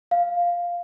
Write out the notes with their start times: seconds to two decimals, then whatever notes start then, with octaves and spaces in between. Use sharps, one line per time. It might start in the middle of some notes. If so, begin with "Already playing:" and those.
0.11 F5